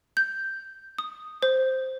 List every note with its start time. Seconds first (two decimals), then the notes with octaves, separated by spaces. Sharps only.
0.17 G6
0.99 D#6
1.43 C5